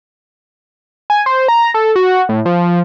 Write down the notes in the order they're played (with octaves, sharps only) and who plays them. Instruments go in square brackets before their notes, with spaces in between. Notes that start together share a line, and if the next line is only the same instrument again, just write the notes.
[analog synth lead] G#5
C5
A#5
A4
F#4
A2
F3